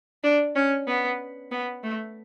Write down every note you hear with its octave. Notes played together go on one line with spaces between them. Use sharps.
D4
C#4
B3
B3
A3